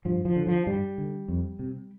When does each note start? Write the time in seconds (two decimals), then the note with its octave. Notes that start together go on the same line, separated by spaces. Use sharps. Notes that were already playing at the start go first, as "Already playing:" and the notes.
0.05 G2 F3
0.25 F3
0.36 D3
0.47 F3
0.66 G2 G3
0.98 D3
1.28 F2
1.59 C3